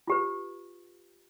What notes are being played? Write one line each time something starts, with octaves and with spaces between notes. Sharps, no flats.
F4 G4 B4